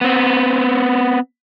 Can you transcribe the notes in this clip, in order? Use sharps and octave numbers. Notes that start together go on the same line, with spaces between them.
B3 C4